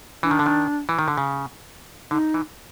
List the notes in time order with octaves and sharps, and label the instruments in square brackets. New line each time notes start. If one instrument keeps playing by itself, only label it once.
[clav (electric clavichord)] E3 [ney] D4
[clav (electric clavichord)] D#3
D3
D#3
E3
D#3
D3
C#3
[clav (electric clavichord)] D3 [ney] D#4
[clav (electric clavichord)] E3